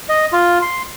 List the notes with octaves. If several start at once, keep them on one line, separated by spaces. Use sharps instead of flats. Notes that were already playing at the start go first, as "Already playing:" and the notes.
D#5
F4
C6